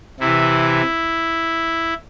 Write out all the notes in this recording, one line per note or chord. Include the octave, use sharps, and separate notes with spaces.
C3 E3 E4